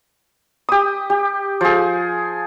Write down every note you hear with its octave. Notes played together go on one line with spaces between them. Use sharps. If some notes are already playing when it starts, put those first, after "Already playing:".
G4 D#6
G4
F3 G#4